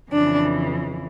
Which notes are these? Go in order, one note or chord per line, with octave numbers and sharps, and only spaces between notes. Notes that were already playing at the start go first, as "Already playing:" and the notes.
F2 C#3 E3 D4